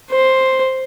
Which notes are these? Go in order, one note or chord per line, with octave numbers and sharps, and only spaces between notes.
C5